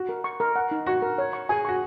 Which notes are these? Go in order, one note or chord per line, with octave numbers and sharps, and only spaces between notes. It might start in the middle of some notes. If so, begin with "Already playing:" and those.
Already playing: F#4
A#4
C#6
A#4
F#5
D#4
F#4 C#6
A#4
C#5
C#6
G#4 G#5
F#4 C#6